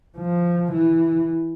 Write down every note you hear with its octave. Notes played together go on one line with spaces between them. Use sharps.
F3
E3